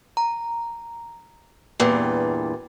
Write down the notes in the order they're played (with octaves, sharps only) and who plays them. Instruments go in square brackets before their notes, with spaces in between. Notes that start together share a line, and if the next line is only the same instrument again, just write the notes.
[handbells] A#5
[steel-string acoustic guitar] E2 G2 A#2 [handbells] B4 G5 D6